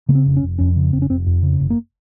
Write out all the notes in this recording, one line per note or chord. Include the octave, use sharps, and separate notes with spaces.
C#3 A#3
C4
F1
C#4
F1
F2 C#4
C#3
F1 C4
C#4
F1 C4
F2
C#3
F#1
A#3